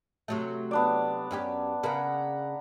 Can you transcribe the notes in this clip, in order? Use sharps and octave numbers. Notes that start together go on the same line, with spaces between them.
C3 F#3 A3
B3 D4 D5
F#2 C#4 G4
C#3 A#3 F#5 A#5 B5